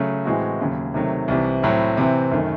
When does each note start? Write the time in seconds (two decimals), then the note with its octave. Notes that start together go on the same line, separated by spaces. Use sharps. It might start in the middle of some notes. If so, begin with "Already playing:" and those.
Already playing: C#3 F#3 A3
0.25 A2 E3 G#3 C4 F#4
0.60 D#2 C#3 F#3
0.94 C3 D#3 F#3 A3
1.28 C2 C3 E3
1.63 A2 F#3 C4 E4
1.97 C3 E3 C4
2.31 F#2 D#3 A3